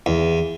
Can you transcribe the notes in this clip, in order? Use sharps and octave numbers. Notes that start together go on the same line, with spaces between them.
E2